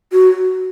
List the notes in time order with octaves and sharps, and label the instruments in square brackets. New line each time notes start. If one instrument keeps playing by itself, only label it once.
[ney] F#4